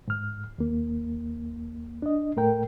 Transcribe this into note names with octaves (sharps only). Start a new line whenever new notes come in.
G#2 F6
D#2 A#3
D4 D#5
A2 A3 A#4 G5